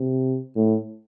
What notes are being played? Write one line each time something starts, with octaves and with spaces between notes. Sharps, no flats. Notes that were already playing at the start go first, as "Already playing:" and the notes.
Already playing: C3
A2